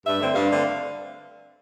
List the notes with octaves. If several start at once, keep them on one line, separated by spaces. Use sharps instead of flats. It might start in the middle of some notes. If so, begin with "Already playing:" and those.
G2 E5
D3 A3 C4
G2 F5
D3 A3 C4